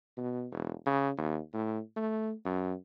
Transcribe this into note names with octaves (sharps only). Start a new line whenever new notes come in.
B2
E1
C#3
D#2
A2
A3
F#2